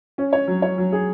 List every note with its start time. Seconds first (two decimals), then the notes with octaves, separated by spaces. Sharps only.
0.18 C#4
0.33 C#5
0.47 F#3
0.62 C#5
0.78 F#3
0.93 G#4